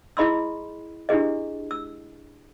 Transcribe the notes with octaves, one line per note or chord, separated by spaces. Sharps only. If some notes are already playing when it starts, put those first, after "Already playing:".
E4 G#4 D#5 B5 C6 E6
D4 E4 G4 G#4 D#5
E6